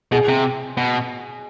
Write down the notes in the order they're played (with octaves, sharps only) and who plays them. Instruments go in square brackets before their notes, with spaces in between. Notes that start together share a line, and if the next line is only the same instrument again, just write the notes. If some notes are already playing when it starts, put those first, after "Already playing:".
[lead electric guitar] B2 [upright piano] G#4
[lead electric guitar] C3
B2